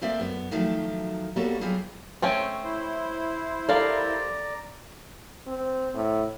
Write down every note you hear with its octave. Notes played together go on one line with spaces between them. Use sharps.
G#3 A#3 C4 A4 D5 E5
F#2 B3
D#3 F3 F#3 A3
G3 A#3 B3 F#4 A4 C#5
F#3 G3 B3 F4 G#4
A3 C4 C#4 G5 G#5
E4 C5
G3 A4 A#4 D5 F5 A#5
C4
A2